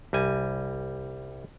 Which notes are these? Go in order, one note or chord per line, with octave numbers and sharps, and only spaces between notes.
C2 G3 G#5